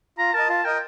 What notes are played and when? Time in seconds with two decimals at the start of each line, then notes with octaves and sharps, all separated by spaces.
0.18 F4 A#5
0.34 A#4 D#5 A5
0.49 F4 A5
0.65 A#4 D#5 G5